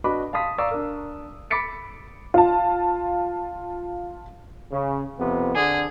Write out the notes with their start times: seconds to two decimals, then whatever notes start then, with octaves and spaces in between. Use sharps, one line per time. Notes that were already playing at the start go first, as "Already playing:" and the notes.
0.04 D4 F#4 B4 D#5 B5 D6
0.33 F5 A5 C6 D#6 B6
0.58 D5 F5 A#5 C#6 E6
0.71 D4 A#4
1.51 B5 D6 A6 B6 C#7 D7
2.34 F4 A5
4.72 C#3
5.19 F2 C3 B3
5.55 D3 G#4